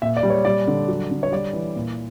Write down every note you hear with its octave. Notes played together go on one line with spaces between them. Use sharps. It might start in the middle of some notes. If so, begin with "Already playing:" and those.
A#2 E5
D5
G3
C#5
G3 D5
D3
F#3
D3
C#5
G3 D5
E3
A#2